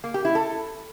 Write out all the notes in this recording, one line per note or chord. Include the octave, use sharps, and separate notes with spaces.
A#3
G4
E4
A4